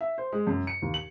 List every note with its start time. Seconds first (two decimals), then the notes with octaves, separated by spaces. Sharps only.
0.01 E5
0.18 C5
0.32 G#3
0.47 F#2
0.67 C#7
0.82 D#2
0.94 F#7